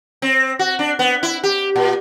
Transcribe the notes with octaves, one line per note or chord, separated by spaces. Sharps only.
C4
F#4
D4
B3
E4
G4
A#2